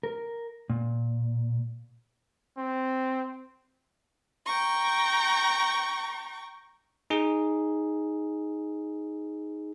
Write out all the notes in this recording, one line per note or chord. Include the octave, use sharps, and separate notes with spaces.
A#4
A#2
C4
G5 A#5 C#6
D#4 G#4